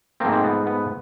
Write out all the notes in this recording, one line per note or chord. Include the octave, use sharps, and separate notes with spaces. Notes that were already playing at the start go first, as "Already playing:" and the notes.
G#2 F3 A3 A#3 C4
C4
B3
B3